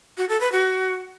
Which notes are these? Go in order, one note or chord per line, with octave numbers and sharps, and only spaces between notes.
F#4
A4
B4
F#4